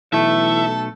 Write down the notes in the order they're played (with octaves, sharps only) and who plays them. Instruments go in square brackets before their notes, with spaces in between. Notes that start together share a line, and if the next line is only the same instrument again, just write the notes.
[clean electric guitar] B1 A3 [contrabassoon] E3 [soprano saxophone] A4 [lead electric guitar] E5